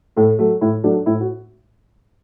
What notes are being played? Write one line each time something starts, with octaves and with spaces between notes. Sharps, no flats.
A2 A4
F#3 A3
A2 E4
F#3 A3 D4
A2 E4
F#4